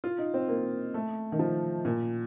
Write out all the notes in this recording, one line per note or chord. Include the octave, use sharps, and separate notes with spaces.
F4
D#4
C4
A#3
A3
D#3
F3
A#2